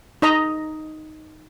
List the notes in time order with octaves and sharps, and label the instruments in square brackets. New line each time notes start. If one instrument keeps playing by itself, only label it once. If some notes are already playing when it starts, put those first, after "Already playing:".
[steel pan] D#4 D#5 A#5